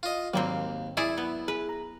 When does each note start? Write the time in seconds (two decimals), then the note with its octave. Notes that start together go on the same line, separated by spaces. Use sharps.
0.03 F4 D#5
0.34 D#2 G#2 F#3 G3 A#3 C4
0.97 E4 G#4 D5 E5
1.17 B3
1.48 G#4 B4
1.69 A#5